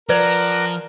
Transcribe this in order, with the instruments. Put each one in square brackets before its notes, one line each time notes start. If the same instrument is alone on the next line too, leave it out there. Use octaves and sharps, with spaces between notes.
[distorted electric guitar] F3 [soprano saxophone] A#4 [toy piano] B4 D5 [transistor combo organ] F#5 A#5 D6